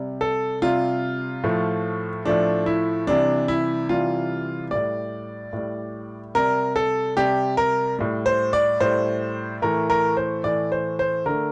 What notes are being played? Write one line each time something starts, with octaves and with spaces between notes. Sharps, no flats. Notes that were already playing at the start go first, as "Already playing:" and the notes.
Already playing: C3 G3
A4
C3 G3 F4
A2 F3 A3
A2 F3 A3 D4
E4
C3 E3 G3 D4
E4
C3 E3 G3 F4
A2 G3 D5
A2 G3
C3 G3 A#4
A4
C3 G3 G4
A#4
A2 G3
C5
D5
A2 G3 C5
A2 E3 A3 A#4
A#4
C5
A2 E3 A3 D5
C5
C5
D3 A3 A#4